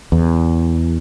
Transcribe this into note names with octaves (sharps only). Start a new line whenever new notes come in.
E2